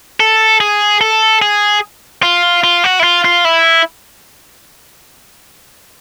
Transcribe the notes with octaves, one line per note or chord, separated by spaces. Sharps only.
A4
G#4
A4
G#4
F4
F4
F#4
E4
F4
F4
E4